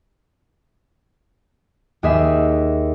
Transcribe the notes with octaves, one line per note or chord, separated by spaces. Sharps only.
D#2 G#4 E5